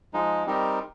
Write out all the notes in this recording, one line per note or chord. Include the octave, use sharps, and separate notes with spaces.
F3 G#3 D#4
G3 C4 D#4 G4 A#4